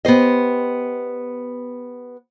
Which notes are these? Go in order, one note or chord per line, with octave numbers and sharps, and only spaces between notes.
B3 G4 C5 D#5